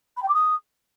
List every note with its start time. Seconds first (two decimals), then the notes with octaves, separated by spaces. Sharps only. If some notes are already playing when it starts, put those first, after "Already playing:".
0.17 B5
0.23 G5
0.28 D6
0.34 D#6